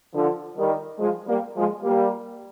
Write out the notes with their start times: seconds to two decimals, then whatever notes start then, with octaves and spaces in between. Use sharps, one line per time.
0.14 D3 F3
0.57 D#3 G3
0.99 F3 G#3
1.27 G3 A#3
1.55 F3 G#3
1.83 G3 A#3